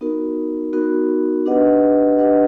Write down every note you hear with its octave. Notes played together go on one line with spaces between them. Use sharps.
B3 D#4 F#4 A#4
B3 D#4 F#4 A#4
D4 G4 B4 D#5 F#5
D4 G4 B4 D#5 F#5